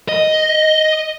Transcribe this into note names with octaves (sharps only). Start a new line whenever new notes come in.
D#5